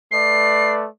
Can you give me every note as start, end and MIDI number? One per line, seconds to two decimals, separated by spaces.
0.11 0.86 57
0.11 0.86 71
0.11 0.86 74
0.11 0.73 96